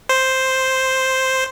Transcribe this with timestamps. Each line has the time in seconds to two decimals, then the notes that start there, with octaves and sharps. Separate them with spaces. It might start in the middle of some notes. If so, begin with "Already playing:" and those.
0.09 C5